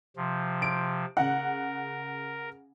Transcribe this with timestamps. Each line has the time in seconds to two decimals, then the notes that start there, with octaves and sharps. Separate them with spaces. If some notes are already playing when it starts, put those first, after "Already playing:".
0.16 C3 F3
0.62 D7
1.17 C#3 A#4 F#5